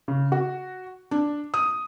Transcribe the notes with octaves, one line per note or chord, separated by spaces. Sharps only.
C#3
F#4
D4
D#6